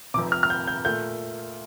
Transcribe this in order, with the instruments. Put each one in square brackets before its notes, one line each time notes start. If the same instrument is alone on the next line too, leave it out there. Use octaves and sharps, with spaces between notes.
[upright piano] C3 D6
F1 F2
F6
F6
G6
G6
A#2 A3 G6